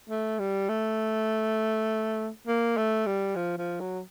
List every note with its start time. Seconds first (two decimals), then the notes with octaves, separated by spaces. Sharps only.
0.10 A3
0.39 G3
0.69 A3
2.47 A#3
2.77 A3
3.06 G3
3.36 F3
3.58 F3
3.80 F#3